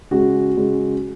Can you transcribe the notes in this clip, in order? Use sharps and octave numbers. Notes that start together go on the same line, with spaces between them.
C#3 G#3 F#4
C#3 G#3